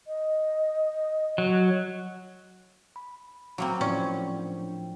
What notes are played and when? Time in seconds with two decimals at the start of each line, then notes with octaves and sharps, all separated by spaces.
0.07 D#5
1.38 F#3
2.96 B5
3.58 F#3 A#3 C4 B5
3.81 A2 F3 C#4 D5 G5
4.36 D4 G5